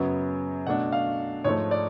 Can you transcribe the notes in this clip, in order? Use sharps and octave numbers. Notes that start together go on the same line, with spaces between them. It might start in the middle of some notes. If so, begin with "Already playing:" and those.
Already playing: F#2 C#3 F#3 B3
B2 A3 D4 F#5
F5
G#2 F3 A3 C#5
D5